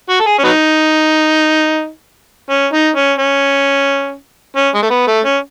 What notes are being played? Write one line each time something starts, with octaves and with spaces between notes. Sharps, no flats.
F#4
A4
G#4
C#4
F#3 B3 D#4
C#4
D#4
C#4
C#4
C#4
G#3
A3
B3
A3
C#4